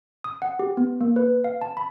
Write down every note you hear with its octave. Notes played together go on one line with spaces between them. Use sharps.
D#6
F#5
G4
B3
A#3
B4
F5
A5
B5